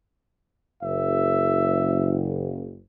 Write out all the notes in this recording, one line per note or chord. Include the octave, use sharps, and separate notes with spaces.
F#1 E5